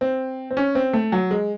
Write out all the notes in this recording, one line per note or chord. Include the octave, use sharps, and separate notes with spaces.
C4
C4
C#4
C4
A3
F#3
G#3